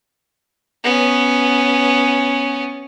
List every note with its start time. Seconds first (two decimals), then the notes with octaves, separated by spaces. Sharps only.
0.84 B3 C#4